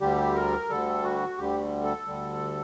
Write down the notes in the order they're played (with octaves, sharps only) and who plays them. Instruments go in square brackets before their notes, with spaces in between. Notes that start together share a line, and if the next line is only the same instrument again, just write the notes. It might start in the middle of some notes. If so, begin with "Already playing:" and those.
[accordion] D2 D3 G3 G4
A#4
D2 D3 G3 A4
F#4
D2 D3 G3 G4
A4
D2 D3 G3